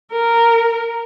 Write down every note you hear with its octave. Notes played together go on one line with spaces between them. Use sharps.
A#4